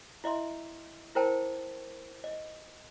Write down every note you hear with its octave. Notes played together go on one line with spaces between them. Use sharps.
E4 D#5 E5 C6
E4 A#4 C5 G5 A5
D#5